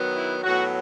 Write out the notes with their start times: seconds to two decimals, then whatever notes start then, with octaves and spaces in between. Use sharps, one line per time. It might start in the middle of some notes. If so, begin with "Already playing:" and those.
Already playing: D#3 F#3 B3
0.15 E4
0.44 A2 F#3 B3 F#4